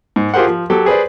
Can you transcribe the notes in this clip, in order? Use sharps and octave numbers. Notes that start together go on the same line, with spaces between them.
G#2
F4 G4 G#4 A#4 C5 F#5
F3
F#3 G4 A4
G#4 B4 C5 D5